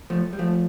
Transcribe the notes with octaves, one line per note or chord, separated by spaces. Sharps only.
F3 A3
G3
F3 A3